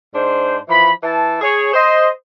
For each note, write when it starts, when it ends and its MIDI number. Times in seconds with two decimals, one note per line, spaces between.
0.14 0.58 44
0.14 0.58 62
0.14 0.58 72
0.69 0.91 52
0.69 0.91 53
0.69 0.91 83
1.03 1.39 52
1.03 1.39 64
1.03 1.39 81
1.42 1.71 68
1.42 1.71 73
1.74 2.08 72
1.74 2.08 75